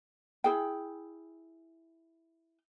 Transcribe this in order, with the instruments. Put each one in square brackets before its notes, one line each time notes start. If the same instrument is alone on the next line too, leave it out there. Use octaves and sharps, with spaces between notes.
[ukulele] E4 G#4 G5